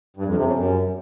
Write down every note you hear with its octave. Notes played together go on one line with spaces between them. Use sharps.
G2
F2
C3
C#3
F#2